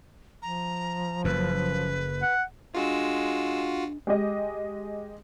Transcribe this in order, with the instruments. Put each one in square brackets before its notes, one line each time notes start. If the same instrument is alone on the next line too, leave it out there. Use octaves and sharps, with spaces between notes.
[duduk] F3 [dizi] A#5
[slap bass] F#1 F#2 [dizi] B4
[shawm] F#5
[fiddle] G#3 E6 [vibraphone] D4 [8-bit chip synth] F4 F#4
[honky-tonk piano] G#3 G4 D#5